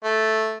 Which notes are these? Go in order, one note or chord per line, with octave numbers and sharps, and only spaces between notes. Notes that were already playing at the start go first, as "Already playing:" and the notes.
A3